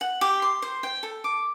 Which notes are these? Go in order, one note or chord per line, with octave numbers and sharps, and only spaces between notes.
F#5
G4
C6
C5
G5
A4
D6